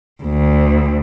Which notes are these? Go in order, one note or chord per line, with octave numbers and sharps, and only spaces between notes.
D2